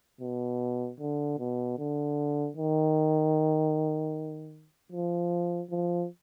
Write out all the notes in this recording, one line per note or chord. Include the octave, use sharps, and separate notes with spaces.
B2
D3
B2
D3
D#3
F3
F3